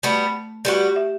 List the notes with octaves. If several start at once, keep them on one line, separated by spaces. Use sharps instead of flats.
G3 A3 B3 F#4
G3 B3 F#4 G4
G4
E5